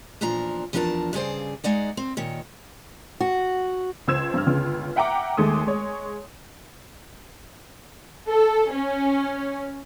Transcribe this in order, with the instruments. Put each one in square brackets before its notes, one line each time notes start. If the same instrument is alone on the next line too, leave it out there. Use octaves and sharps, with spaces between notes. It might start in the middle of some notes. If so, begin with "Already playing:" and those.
[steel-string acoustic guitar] E2 A#2 F3 D4 A#5
E2 F3 D4 A#4 D#5 A5
G2 C#3 G#4 C5 D5
G#3 D#4 D5 F#5
C4
A#2 D#3 C#5
F#4
[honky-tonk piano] C#2 C5 E6 G#6 E7
G2 F6
G1 C#2 C#3
E5 F#5 G5 A#5 D6
D#2 G#3 A3 D#6
G#3 C#5
[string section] A4
C#4